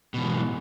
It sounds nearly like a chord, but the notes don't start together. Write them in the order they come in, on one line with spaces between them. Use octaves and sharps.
B2 E3 G#2